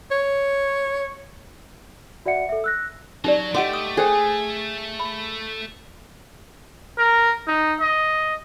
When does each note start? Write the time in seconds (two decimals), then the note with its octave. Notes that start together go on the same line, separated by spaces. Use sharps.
0.11 C#5
2.26 F#4 D5 E5 F#5 C#7
2.49 A4 E5
2.64 E6 F#6 A#6
3.25 F#3 D#4 G4 D5
3.54 A3 G4 D#5 F#5 C6 D6
3.73 D#6
3.97 G#4 A4 C5 G5
5.00 B5
6.98 A#4
7.47 D#4
7.80 D#5